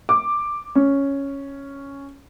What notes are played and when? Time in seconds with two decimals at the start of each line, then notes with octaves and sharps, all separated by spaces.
0.09 D6
0.75 C#4